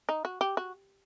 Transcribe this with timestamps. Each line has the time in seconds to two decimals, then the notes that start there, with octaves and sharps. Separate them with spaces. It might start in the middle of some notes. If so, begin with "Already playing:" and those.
0.09 D#4
0.25 F#4
0.41 G4
0.57 F#4